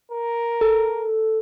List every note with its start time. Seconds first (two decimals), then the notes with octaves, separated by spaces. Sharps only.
0.12 A#4
0.61 A4